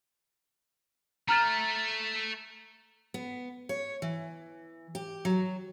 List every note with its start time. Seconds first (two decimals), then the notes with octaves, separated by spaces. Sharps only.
1.28 A3 A#5 F6 A6
3.14 B3
3.69 C#5
4.02 E3
4.95 G4
5.25 F#3